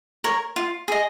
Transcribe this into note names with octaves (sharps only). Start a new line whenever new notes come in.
A#4 C#5
F4
G#4 D#5